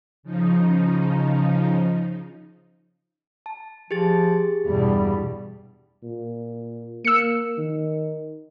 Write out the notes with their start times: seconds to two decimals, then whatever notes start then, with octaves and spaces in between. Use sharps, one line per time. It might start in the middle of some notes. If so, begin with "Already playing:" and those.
0.23 C#3 F3 D#4
3.46 A5
3.91 F3 G4 G#4 A6
4.66 E2 G2 B2 G3
6.03 A#2
7.05 A#3 E6 C#7
7.58 D#3